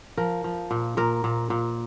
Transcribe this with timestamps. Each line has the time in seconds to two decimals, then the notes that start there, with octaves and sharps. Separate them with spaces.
0.17 F3 A#4
0.44 F3
0.71 A#2
0.97 A#2 A#4
1.24 A#2
1.50 A#2